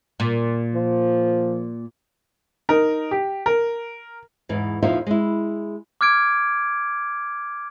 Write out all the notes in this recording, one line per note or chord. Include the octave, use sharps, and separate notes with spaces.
A#2
F3
D#4 A#4
G4
A#4
E2 G#2 E3
E2 A#2 F3 D#4 F4 E5
G#3 E4
D6 F6 G#6 D7